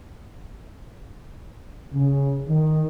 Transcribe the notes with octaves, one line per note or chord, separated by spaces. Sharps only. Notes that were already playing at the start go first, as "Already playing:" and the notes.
C#3
D#3